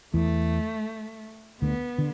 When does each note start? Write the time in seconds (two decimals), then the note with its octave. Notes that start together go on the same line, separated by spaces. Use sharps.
0.14 E2 E3 A3
1.62 D2 D3 B3
1.98 D3